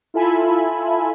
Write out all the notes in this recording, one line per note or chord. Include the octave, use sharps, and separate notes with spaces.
E4 F4 A4 E5 G#5 B5